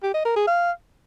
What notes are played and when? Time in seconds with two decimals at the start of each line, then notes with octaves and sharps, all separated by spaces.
0.03 G4
0.14 D#5
0.25 A#4
0.36 G#4
0.47 F5